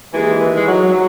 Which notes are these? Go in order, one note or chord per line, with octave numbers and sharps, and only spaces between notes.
D#2 E3 G#3
E3
D#3 G#3
F#3
F#3